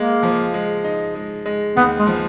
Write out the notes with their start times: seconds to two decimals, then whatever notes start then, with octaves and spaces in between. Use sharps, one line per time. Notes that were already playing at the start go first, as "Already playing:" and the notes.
Already playing: G#3 A#3
0.23 F3
0.54 G#3
0.84 D#4
1.15 G#3
1.46 G#3
1.77 D#2 B3
1.99 G#3
2.07 F3